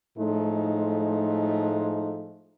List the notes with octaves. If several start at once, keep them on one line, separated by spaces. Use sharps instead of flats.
A2 F3 G#3 A3 D#4